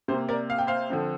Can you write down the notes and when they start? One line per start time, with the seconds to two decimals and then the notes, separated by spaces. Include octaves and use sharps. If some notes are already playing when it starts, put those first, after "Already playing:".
0.08 C3 C5
0.13 A#3
0.28 A#4 D5
0.50 F5
0.58 G5
0.67 C5 F5
0.90 D3 F3 C4